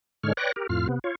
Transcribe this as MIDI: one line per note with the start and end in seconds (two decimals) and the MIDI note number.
0.23 0.33 44
0.23 0.33 50
0.23 0.33 56
0.23 0.33 73
0.23 0.33 89
0.37 0.52 71
0.37 0.52 73
0.37 0.52 74
0.37 0.52 79
0.37 0.52 90
0.37 0.52 94
0.56 0.67 67
0.56 0.67 70
0.69 0.87 41
0.69 0.87 45
0.69 0.87 65
0.69 0.87 89
0.89 0.99 48
0.89 0.99 59
1.04 1.15 65
1.04 1.15 73